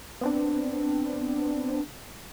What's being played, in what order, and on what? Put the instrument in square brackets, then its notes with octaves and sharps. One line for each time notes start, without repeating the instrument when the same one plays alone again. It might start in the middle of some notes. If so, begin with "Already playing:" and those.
[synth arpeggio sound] B3 C4 D4